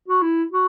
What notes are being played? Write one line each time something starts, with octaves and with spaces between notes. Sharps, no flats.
F#4
E4
F#4